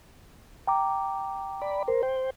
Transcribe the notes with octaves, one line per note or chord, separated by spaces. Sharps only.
G5 A#5 D6
D5 B5
A#4 C5
C5 G5